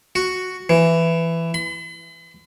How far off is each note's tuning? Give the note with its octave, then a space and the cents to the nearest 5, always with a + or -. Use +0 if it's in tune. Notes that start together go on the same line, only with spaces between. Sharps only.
F#4 +0
E3 +10
B5 +45